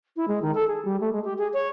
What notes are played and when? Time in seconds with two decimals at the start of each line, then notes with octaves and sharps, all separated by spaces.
0.16 E4
0.28 G#3
0.42 D#3
0.55 A4
0.68 G#4
0.85 G3
1.00 A3
1.12 G#3
1.24 G4
1.38 G#4
1.53 C#5